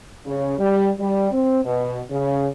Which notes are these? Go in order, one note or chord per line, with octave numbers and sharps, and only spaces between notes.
C#3
G3
G3
C4
B2
C#3